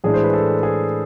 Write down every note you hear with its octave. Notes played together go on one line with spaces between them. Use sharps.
A2 E3 G#3 D4 G#4
C5
B4
A4
G#4